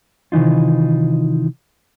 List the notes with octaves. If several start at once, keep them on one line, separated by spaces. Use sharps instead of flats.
C3 D#3 E3 D#4 F4